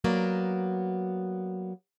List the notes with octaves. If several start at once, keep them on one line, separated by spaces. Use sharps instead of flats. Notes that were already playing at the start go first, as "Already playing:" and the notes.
F#3 A#3 B3 D5